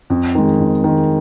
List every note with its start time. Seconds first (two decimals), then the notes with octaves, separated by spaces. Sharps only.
0.10 F2
0.35 D#3 G#3
0.60 F2
0.84 D#3 G#3